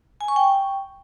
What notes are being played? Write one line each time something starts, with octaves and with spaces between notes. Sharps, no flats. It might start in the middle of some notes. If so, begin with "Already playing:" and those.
G#5
C#6
G5